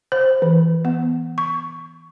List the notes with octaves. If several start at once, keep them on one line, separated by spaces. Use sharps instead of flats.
C5
E3
B3
C#6